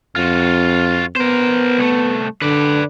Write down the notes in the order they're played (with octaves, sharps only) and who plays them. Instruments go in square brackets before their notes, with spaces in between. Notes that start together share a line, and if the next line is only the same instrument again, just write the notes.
[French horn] F2 [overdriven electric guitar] F4 F#4
[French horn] B3 [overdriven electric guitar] A#4 C5
[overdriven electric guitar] C2 A3
[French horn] D3 [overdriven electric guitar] B4 D5